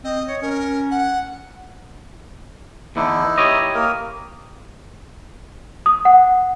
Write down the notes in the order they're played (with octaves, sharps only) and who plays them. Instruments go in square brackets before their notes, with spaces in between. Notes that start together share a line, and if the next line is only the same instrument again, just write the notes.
[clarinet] C4 [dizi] D#5
[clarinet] C#5
[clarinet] C#4 [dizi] A#4
[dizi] F#5
[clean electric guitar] E2 D3 [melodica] D#4 E4
[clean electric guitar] G4 C#5 D#5
[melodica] A#3 A#4
[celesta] D#6
F#5